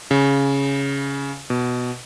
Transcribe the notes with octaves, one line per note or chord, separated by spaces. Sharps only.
C#3
B2